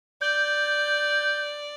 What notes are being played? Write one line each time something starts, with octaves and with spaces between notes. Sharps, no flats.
D5 G6